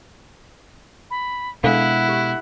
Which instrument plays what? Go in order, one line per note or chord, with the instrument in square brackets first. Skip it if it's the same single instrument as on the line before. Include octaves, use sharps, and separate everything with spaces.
[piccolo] B5
[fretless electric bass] B2 G#3 [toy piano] D4 A4 F5 [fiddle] E4 [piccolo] F#5
[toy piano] G4